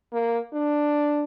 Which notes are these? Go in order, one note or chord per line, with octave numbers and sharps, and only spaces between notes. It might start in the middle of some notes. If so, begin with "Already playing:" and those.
A#3
D4